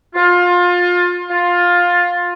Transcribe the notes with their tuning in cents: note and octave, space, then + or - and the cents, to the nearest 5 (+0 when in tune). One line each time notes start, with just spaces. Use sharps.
F4 +25
F4 +15